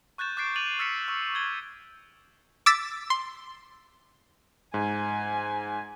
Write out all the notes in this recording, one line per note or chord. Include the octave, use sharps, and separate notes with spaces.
C#6 F#6 G6 A6 E7
D6 F#6 G6 A6 C7 D7
D6 A6 D#7 F7 F#7
E6 F6 A6 B6 C#7 E7
C#6 E6
G#6 G7
D6 E6 A6 B6
C6
G#2 G#5